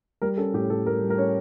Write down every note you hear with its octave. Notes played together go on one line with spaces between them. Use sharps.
G3 A#4
C#4 A4
A2 G4
A2 A4
G3 A#4
G3
A#4
C#4 C#5